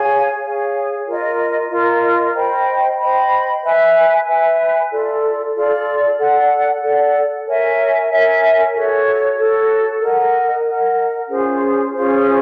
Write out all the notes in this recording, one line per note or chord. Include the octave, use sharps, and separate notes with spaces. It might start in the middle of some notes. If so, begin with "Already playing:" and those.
Already playing: G#4 C#5 F5 G#5
G#4 C#5 F5 G#5
F4 A#4 D#5
F4 A#4 D#5
C5 D#5 G5 B5
C5 D#5 G5 B5
B4 E5 G#5
B4 E5 G#5
F4 A4 D5
F4 A4 D5
A4 D5 F#5
A4 D5 F#5
A#4 C#5 E5 G#5
A#4 C#5 E5 G#5
F#4 A4 C#5
F#4 A4 C#5
A#4 D#5 F#5
A#4 D#5 F#5
C#4 F4 G#4 C5
C#4 F4 G#4 C5